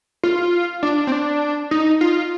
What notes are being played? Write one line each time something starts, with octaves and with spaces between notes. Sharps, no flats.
F4
D4
C4
D4
D#4
F4